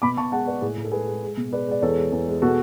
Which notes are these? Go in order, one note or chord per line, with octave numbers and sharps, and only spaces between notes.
B2 B5 D6
B2 A5 C#6
G#3 F#5 A5
G#3 B4 D5
A2 G#4
A2
A4
G#3 G#4 B4
G#3
G#3
B2
G#3 B4 D5
G#3 D5
E2 A4 C#5
G#3
E2
G#3
B2 F#4 A4